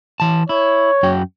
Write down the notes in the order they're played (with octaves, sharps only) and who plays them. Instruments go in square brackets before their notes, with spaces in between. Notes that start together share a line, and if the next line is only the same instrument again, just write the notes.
[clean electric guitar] E3 A5
[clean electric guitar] E4 [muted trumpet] C#5
[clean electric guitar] F#2 F#4 G5